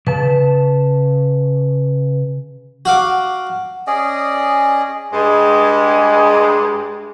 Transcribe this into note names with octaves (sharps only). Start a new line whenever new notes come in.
C#3 B4 A5
F#4 F5 D6
C#4 G#4 D5 D#5
G2 G#3